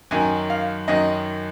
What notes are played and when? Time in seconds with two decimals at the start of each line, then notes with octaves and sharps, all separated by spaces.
0.11 F#2 D#3 F#3 G#5
0.50 F5
0.88 F#2 D#3 F#3 D#5